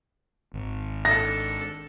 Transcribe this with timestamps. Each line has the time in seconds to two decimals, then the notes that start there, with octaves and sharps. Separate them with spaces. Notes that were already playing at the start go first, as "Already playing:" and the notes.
0.54 G#1
1.05 D4 A4 A#6